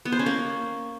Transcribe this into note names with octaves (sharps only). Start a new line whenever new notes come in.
B3
C5
C#4
A#3